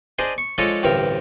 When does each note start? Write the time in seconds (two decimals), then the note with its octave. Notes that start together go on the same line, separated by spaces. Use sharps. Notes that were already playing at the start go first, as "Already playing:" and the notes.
0.19 D4 G#4 C5 D#5 G#5
0.38 C#6
0.58 F3 G#3 D4 A4 C#5 D#5
0.83 A1 D2 G2 C4 A#4